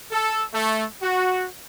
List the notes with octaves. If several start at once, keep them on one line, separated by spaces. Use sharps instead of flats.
A4
A3
F#4